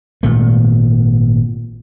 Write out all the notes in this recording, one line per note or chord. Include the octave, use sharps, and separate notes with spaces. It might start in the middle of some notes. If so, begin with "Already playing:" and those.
G#1 A#2 A3